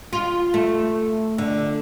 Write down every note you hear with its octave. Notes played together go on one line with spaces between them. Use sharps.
F4
A3
D3